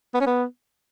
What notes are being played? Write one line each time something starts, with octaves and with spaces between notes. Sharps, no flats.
B3
C#4
B3